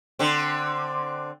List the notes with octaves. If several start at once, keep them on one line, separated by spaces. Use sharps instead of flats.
D3 C4